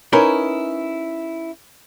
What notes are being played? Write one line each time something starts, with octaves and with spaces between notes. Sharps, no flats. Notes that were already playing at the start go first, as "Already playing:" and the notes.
C#4 D#4 E4 A#4 B4 C#5